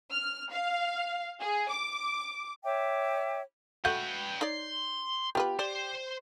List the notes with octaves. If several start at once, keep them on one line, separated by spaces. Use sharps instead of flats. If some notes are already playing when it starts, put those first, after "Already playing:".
F6
F5
G#4
D6
C#5 E5 G5 D6
A3 F#4 B4 F#5 G5 G6
D#4 C#5 D5 C6
B3 F4 G4 B4
C5 D5